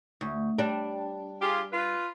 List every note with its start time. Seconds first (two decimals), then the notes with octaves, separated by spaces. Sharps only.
0.21 D2
0.58 G3 D4
1.41 F4 G4 G#4
1.72 F4 B4